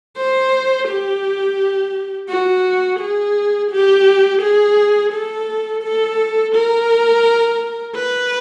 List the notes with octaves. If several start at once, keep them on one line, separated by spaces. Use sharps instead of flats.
C5
G4
F#4
G#4
G4
G#4
A4
A4
A#4
B4